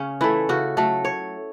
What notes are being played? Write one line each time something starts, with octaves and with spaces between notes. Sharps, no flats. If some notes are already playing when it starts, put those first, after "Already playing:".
Already playing: C#3 C#4
E3 A3 E4
C#3 F#4
F#3 A3 A4
C#5